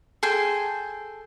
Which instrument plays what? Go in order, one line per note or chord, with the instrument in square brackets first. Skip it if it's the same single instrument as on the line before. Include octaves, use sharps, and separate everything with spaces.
[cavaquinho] G#4 A4 G5 C6